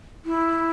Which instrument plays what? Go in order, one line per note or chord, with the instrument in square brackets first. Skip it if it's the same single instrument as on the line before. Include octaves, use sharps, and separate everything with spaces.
[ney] E4